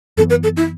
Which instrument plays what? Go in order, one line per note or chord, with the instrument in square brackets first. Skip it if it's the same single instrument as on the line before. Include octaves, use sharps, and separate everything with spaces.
[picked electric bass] F#2 E3 B3 [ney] A4
[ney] B4
A4
E4